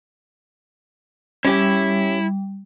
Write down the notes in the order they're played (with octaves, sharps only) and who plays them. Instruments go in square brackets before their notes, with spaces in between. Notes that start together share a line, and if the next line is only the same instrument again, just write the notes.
[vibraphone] G3 [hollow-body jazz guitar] C#4 G4 [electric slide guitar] E4